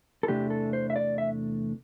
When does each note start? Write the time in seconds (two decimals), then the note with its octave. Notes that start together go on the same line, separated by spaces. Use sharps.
0.23 A4
0.28 E2 C3 E3 A3 D4 G4
0.50 A4
0.73 C5
0.90 E5
0.96 D5
1.18 E5